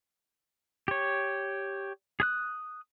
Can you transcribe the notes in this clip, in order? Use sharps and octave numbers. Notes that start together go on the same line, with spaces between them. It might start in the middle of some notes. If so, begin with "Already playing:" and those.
G4 C#5
G#4 D#6 F#6